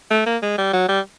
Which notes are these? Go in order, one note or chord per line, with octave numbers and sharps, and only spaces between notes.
A3
A#3
G#3
G3
F#3
G3